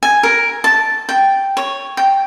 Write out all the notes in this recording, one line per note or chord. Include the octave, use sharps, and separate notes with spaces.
G#5
A#4
A5
G5
C#5
G5